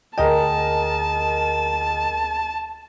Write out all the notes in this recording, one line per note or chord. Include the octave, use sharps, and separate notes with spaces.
D2 G#4 A#4 D#5 G5 A5